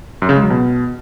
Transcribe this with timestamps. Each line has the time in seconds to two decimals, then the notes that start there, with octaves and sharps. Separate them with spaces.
0.22 F#2
0.29 C#3
0.36 G#3
0.43 F#3
0.50 B2